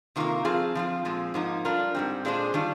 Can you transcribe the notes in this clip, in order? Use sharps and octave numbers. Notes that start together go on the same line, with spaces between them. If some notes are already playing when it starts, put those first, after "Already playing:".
C3 D#3 A#3 F4 A#4
F3 C4 F4 G#4
F3 C4 F4
A#2 F3 G#3 C4
G#2 F3 A#3 D#4
G3 D4 F4 A#4
G#2 G3 C4
A#2 G#3 D4 G#4 C5
D#3 G3 D4 F4